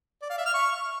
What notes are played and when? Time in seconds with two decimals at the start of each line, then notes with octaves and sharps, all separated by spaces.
0.22 D5
0.30 F5
0.38 E5
0.46 F6
0.54 C#6